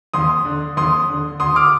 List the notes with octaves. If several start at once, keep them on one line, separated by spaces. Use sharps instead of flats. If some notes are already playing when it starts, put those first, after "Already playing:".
D#2 C6 D#6
D3
D#2 C6 D#6
D3
D2 C6 D#6
D6 F6